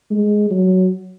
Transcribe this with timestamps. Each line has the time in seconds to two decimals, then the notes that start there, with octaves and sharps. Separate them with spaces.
0.11 G#3
0.51 F#3